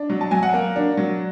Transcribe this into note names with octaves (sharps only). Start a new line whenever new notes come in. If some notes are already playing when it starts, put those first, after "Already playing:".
Already playing: D4
F#3
A5
F#3 G#5
F#5
A#3
D4
F#3